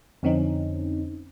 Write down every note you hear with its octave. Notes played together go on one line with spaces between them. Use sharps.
F2 D3 C4 C#4 D#4